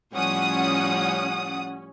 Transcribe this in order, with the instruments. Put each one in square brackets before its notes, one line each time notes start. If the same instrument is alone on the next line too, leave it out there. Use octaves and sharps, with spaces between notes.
[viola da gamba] A2 F3 G3 [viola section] C#4 [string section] F#5 D#6